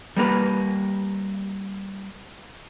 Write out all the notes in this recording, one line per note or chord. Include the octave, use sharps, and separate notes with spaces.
G3 A#3 A#4 B4